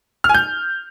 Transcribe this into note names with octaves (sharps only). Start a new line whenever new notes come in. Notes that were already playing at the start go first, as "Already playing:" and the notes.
F6
G#5
G6